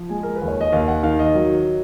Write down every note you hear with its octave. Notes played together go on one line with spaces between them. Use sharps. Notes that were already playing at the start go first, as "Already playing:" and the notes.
Already playing: F3
G#3 G#5
A#4
B4
D#2
C#5
D#5
D#2 F5
F#5
D#3 F5
D#5
F#3